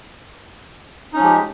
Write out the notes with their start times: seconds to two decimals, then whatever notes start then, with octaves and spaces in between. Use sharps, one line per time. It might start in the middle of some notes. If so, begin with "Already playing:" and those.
1.13 D#4
1.16 C#4
1.19 F3
1.21 G#3
1.24 G4